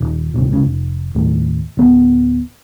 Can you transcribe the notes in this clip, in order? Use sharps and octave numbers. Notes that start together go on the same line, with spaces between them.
D#1
D1 G1 C2 C3
E1 C#2 C#3
F1
D#2 A2 A3
D1 B3